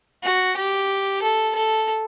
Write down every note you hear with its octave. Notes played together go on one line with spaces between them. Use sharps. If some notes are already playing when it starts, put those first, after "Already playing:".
F#4
G4
A4
A4